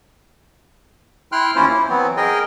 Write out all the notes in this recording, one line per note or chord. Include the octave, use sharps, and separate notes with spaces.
E4 G5 C6 F6 F#6
D#2 A#3 C#4 E4 F4 C5
E4
E3 F#3 B3 C4
G#4 A#4 D#5 G5